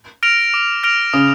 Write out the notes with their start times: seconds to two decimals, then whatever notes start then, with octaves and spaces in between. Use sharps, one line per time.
0.23 F6 A#6 D7 F7
0.54 D6
0.83 F6 A#6 D7 F7
1.13 C#3 D#6